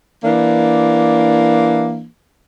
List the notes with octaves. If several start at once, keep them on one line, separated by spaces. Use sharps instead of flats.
E3 A#3 D4